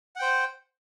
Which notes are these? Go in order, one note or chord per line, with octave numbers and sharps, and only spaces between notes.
C5 F#5 G5